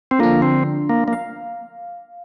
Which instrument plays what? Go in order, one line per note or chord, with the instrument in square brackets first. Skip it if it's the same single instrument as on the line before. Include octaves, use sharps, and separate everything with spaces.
[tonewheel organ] C4
[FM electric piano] D3 F3 D4 [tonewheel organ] A#3
[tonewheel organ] C4
A#3
A#3
[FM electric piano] F5